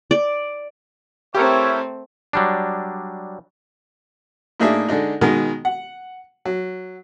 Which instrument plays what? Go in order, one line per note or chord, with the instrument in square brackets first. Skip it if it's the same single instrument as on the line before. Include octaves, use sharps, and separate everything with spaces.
[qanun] D5
[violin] A3 C4 [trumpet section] E4 C#5 [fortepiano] G4 A#4
[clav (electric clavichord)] F#3 G3 D4
[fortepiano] A2 A#3 D4 D#4 G#4 E5
D3 G#3 D4 D#4
B2 D#3 G#3 F#4 A#4
F#5
F#3